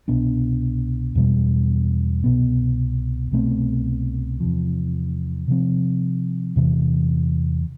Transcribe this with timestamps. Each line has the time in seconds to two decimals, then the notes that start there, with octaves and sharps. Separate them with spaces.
0.08 C2 B2 B3 D4
1.15 E2 B2 G3
2.24 C2 B2 B3
3.31 C2 B2 A3 C4
4.40 E2 C3 F3
5.48 C3 F3 C4
6.56 E2 C3 E3